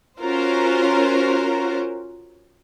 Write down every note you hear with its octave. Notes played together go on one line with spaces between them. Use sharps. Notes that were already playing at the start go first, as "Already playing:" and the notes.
C#4 F4 F#4 A#4 C5